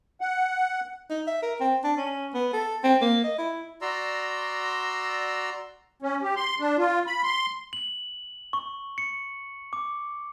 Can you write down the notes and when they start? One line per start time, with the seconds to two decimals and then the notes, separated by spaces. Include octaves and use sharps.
0.21 F#5
1.10 D#4
1.27 E5
1.43 A#4
1.60 C4
1.84 D4
1.97 C#4
2.34 B3
2.53 A4
2.84 C4
3.01 A#3
3.24 D#5
3.38 E4
3.82 F#4 D5 A#5 C6 E6
6.02 C#4
6.23 G4
6.36 C6
6.60 D4
6.79 F4
7.07 B5
7.23 C6
7.73 F#7
8.53 C#6
8.98 C#7
9.73 D6